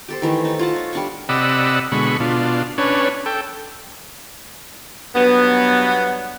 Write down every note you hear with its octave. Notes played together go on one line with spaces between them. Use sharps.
G4 A4 C5
D#3 E3 A3
D#4 A4
F4 F#5 A5
C#5
G3 D4 C#6
C3 D5 D#5 F#5 B5 E6
B2 D3 G#3 B5 C#6
B2 D4 F4
C#4 D4 B4 C#5
A4 G5
G2 F#3 B3